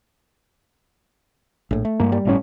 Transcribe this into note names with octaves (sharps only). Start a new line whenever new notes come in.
A#1 A2
A3
G2 A#3
G3
G1 A2 C#4